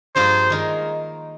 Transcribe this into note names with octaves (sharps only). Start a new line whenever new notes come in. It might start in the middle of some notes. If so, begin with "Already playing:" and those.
G2 F3 A#3 F4 G#4 C5
D#3 G#3 D#4 A#4